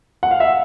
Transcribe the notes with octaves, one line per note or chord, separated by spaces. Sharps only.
F#5
F5
E5